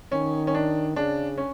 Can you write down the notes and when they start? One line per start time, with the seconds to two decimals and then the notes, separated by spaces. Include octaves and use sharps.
0.12 D#3 C#4
0.47 C#4
0.54 D4
0.96 C#3 D4
1.38 C#4